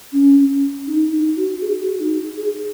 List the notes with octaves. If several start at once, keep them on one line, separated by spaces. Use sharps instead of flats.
C#4
D#4
D#4
F#4
G#4
F#4
D#4
G#4